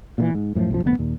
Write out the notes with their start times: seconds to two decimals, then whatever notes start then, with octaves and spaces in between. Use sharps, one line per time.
0.18 A#2 C#3 E3
0.34 G#2
0.55 F#2 A2 D#3 F3
0.70 B1 F#2 F3
0.84 F1 D2 C3 B3
0.99 D#2 A#2